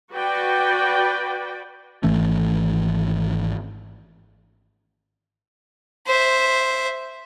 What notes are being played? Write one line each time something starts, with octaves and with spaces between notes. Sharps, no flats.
F#4 B4 D5 G5
G#1 E3 A3 C#4
C5 E5